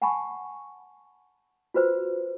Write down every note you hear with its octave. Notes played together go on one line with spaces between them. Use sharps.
F#5 G#5 A5 B5 C#6
F4 F#4 B4 C5